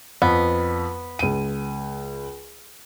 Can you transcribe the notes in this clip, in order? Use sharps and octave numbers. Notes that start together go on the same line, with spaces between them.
F2 B3
C#2 D#7